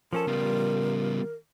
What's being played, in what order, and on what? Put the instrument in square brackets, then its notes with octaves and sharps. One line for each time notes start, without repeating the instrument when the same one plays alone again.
[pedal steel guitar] F3 C#4 A4 [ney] A#4
[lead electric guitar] C#3 B3 [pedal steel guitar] G3 F4